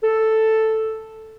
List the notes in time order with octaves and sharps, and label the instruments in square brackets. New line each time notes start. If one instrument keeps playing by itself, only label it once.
[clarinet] A4